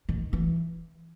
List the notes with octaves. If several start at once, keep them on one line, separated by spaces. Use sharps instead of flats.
D#3
E3